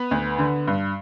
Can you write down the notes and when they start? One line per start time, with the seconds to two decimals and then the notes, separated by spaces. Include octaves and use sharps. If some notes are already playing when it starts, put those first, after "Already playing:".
Already playing: B3 B4
0.11 D2
0.39 D3
0.68 G2